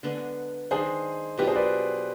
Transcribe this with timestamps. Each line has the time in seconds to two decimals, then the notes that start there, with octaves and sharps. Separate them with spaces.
0.03 D3 G#3 B3 D4
0.71 D#3 G#3 D4 G#4 C5
1.38 B2 B3 D4 F4 G4 B4
1.47 G#4 C5
1.56 B4 D5